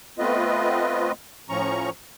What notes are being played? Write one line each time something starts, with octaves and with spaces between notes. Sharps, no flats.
A3 B3 C4 F4 B4 D#5
A2 F3 C#4 A#5 C#6